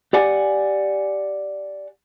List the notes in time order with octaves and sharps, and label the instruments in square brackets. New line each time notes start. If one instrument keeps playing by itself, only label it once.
[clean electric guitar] G4 D5 F#5 G#5